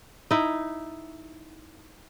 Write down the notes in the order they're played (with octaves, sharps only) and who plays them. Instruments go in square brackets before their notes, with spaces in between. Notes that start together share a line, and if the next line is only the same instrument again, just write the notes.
[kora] D#4 E4